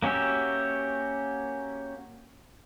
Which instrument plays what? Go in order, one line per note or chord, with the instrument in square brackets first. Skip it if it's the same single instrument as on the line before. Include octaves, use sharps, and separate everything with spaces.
[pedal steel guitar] A#3 C#4 F#4 G4 E5